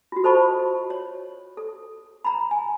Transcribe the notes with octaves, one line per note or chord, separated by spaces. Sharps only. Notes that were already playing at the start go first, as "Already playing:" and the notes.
F4 F#4
A4 C5 D#5 A5 B5 C#6
C#5
A4
A#5 B5
G#5